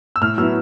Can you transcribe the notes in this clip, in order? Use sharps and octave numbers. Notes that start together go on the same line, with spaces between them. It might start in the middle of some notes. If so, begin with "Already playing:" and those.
E6
A2 F6
F#3 B3 E4 E6